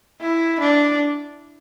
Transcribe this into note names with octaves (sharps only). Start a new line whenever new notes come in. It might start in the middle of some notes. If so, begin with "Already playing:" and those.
E4
D4